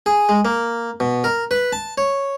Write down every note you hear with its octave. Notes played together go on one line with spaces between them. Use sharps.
G#4
G#3
A#3
B2
A#4
B4
A5
C#5